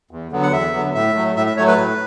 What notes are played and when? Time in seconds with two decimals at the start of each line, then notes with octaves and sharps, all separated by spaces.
0.11 E2
0.31 D3 F#3 B3
0.43 F#5
0.52 E2 E5
0.73 D3 F#3 B3
0.94 A2 E5
1.15 F#3 A3
1.36 A2 E5
1.46 E5
1.57 F#3 A3 C#5
1.67 B4
1.77 A2